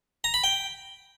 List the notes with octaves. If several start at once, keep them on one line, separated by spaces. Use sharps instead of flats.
A#5
B5
G5